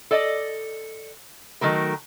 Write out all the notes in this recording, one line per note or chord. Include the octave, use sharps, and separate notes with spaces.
A4 D5 D#5
D#3 F#3 A3 A#4